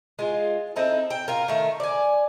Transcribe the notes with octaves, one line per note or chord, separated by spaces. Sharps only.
G#3 F4
C4 D#4 E4 A4
G5
F4 A#4
D#3 A3
D5 G#5